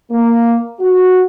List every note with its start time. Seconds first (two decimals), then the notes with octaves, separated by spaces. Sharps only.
0.10 A#3
0.80 F#4